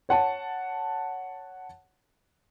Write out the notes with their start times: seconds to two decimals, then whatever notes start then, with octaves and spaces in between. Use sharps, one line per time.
0.09 C#5 F#5 A5